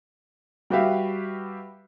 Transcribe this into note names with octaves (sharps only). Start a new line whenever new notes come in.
G3 F#4 G4 B4 E5 F5